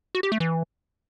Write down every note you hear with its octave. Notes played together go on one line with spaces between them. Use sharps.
F#4
G4
A3
E3